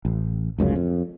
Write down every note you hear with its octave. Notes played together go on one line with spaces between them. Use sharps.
A1
F1 C#2 F#2 C#3
F2